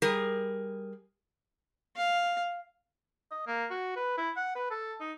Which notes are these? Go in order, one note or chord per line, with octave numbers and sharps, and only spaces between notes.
G3 G#4 A#4
F5
D#5
A#3
F#4
B4
E4
F#5
B4
A4
D#4